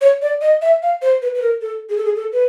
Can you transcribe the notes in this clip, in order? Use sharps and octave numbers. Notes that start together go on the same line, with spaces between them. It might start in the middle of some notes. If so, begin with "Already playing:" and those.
C#5
D5
D#5
E5
F5
C5
B4
B4
A#4
A4
G#4
A4
G#4
A4
B4